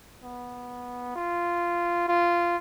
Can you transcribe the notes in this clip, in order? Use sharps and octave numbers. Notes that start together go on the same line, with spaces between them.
B3
F4
F4